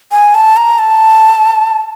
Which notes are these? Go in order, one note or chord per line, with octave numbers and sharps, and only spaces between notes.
G#5
A5
A#5
A5